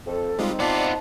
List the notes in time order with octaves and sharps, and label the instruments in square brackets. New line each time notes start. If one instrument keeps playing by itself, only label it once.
[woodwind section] F2 [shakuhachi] A4
[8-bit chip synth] G3 G#3 F4 [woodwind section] C4 D#4
[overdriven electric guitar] B3 F4 [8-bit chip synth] D5 [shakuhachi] A5